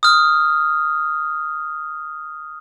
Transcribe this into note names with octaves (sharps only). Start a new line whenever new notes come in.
D#6 F6